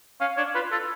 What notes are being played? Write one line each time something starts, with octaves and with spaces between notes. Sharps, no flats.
C#4 F5
D4 C#5
F4 B4
F4 A4